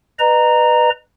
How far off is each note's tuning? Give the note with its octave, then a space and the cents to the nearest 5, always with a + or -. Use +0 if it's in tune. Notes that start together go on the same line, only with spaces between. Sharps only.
B4 +0 D#5 -40 A#5 +0